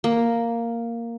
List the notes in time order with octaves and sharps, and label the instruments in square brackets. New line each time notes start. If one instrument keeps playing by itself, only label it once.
[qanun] A#3